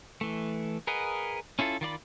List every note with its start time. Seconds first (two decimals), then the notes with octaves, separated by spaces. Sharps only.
0.21 E3 A3
0.87 G#4 A#4 B4 D#5 F#5
1.59 C#4 E4 F4 A4
1.81 D#3 F4 D5 B5